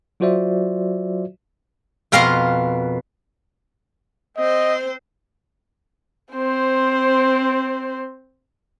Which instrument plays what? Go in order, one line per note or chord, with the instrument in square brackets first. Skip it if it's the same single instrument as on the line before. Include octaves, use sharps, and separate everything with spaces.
[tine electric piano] F#3 F4 F#4 C5 D5 E5
[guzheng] F2 B2 A#4 F5 A#5 C6
[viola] C4 C5 [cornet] D#5
[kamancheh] C4 C5